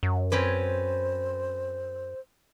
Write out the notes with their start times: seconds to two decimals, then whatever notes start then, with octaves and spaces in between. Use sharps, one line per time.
0.03 F#2
0.32 C4 C#4 B4 C5